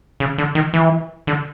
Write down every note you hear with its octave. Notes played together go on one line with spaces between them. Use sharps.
C#3
D3
D#3
E3
D3